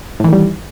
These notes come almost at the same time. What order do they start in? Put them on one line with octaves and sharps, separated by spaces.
A2 E3 D#3 G3